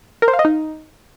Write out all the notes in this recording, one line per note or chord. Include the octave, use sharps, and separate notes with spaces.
A#4
C5
F5
D#5
D#4